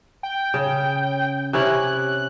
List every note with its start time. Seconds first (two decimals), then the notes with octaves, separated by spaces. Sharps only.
0.23 G5
0.54 C#3
1.53 C3 C#4 E4 F#6